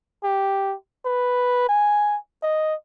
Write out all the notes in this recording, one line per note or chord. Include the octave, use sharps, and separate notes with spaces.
G4
B4
G#5
D#5